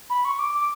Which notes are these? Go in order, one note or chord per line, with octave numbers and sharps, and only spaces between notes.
B5
C#6
D6
D6